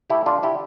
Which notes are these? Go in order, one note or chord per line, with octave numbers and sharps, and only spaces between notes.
A3 E4 G4
D3 D4 F4
D3 E4 G4